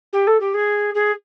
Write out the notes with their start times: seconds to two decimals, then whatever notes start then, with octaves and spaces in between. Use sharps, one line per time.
0.13 G4
0.27 A4
0.40 G4
0.54 G#4
0.95 G#4